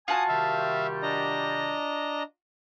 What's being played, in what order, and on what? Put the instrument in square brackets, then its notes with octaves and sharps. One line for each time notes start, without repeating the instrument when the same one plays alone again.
[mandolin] F4 F#4 A5 [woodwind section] G#5 [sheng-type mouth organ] D#6
[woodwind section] C3 D#3 G3 [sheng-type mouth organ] E5 F5
[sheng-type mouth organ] D4 D#5 A#5